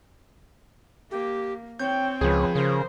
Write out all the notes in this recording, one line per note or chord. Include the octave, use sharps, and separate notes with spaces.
A#3 G4
C4 C#5 G5 G6
C#2 F3 G#4 B4 C#5
C#3 A#4 C5